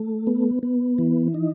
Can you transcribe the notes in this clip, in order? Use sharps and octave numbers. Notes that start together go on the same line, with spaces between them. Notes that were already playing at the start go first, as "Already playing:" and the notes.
Already playing: A3
B3
B3
E3
D#4